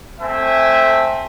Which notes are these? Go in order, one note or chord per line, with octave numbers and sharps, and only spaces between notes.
A3 C4 E5 G#5